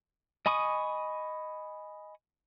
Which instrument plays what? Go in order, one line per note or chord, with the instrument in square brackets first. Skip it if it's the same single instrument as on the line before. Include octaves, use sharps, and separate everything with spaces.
[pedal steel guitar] D#5 G#5 B5 C#6 D#6